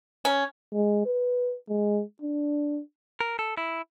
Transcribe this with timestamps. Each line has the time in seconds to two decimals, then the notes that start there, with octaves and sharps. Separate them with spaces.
0.25 C#4
0.73 G#3
1.06 B4
1.69 G#3
2.22 D4
3.21 A#4
3.39 A4
3.57 E4